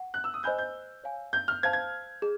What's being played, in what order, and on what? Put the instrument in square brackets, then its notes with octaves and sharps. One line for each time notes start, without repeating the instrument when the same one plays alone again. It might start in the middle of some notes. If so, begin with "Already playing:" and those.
Already playing: [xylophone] F#5
[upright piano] F#6
E6
D#6
[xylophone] C5 D#5 G#5 B5 E6 [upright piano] G6
[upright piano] G6
[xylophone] C#5 F5 G#5
[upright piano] G6
F6
[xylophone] C5 F5 A5 [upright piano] G#6
[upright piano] G#6
[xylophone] G#4